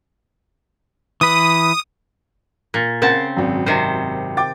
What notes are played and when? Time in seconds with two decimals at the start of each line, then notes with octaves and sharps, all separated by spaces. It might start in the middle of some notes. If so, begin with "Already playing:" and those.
1.21 E3 B4 D#6
2.74 A#2
3.02 C#3 C4 A#4 F#5 A5
3.37 G#1 F#2
3.66 C3 D#3 C5
4.37 G5 D6 A6